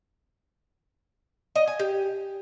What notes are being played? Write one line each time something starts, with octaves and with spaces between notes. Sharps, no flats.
D#5
G#5
G4